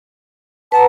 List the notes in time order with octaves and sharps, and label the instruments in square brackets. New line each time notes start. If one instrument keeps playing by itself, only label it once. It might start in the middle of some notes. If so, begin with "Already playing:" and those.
[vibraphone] B4 F#5 A#5 [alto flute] A5